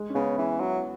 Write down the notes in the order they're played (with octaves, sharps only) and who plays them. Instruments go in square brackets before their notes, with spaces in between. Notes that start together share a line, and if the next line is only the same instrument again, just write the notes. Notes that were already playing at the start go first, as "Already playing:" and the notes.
Already playing: [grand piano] G#3
C#4
[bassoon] C#3 [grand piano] B3
[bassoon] E3 [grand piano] C#4
[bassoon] F#3 [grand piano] E4